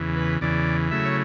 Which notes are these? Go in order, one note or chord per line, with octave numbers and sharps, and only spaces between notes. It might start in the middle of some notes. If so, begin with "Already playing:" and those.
Already playing: E2 C#3 E3
B4
E2 C#3 E3 D5
C#3 F#3 A3 E4 E5
C#5